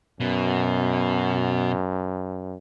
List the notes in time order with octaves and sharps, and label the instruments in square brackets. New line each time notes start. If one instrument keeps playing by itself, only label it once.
[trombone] F#2 [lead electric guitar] B2